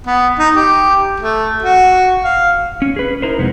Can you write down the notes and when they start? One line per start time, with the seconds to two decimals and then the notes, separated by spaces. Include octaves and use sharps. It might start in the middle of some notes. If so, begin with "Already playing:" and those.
0.06 B3
0.39 D#4
0.55 G4
1.20 A3
1.62 F#4
2.24 F5
2.82 C#4
2.96 G#4 B4
3.22 D#4 E4 A#4 C5
3.38 F2 C3 G#3 B3